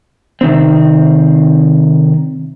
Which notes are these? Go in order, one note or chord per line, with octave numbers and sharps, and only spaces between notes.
C3 D#3 C4